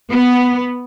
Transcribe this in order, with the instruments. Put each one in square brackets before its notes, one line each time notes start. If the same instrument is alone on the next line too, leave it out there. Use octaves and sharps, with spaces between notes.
[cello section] B3